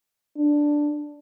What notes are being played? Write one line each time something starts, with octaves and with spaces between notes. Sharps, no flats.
D4